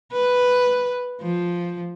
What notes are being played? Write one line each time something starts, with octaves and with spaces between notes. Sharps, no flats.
B4
F3